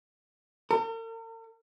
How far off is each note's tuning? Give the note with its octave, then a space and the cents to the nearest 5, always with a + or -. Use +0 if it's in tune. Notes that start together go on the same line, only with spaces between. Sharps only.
A#4 -45